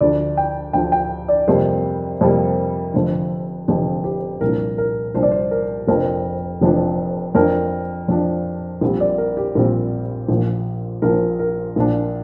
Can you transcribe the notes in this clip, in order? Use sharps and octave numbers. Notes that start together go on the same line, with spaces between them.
D2 D3 F3 D5
G5
D2 D3 F3 G5
G5
D5
F2 C3 G3 A#3 C5
F2 C3 G3 A#3
F1 F2 D3 F3
F1 F2 D3 F3 G4
G4
C2 A#2 F3 D4 A#4
A#4
C2 A#2 F3 D4 C5
D5
C5
A#4
F1 F2 F3 D4 A#4
F1 F2 F3 D4
F2 F3 D4 A#4
F2 F3 D4
A#1 A#2 G3 C4
D5
A#4
G4
A#1 A#2 G3 C4 A#4
A#1 A#2 F3
A#1 A#2 F3 A#4
A#4
A#1 A#2 F3 D4